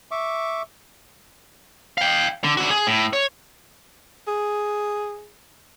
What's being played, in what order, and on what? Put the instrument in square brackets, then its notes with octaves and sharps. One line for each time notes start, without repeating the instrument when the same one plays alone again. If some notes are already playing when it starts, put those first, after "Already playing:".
[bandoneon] E5 C#6 D6
[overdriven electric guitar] F5 G5
D3
D3 F#4
G#4
A2
C#5
[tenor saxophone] G#4